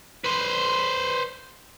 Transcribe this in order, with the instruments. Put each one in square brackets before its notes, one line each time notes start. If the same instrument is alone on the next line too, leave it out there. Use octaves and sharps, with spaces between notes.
[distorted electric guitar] B4 C5